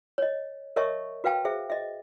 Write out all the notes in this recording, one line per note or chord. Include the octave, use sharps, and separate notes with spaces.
C#5 D#5
A#4 C#5 D#5 E5 A5 C#6
F#4 B4 F5 G5 A5
G#4 C5 E5
D#5 E5